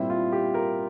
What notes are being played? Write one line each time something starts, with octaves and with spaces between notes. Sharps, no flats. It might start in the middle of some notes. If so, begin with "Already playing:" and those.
Already playing: A#2 G3 C4 E4
F4
G4
A#4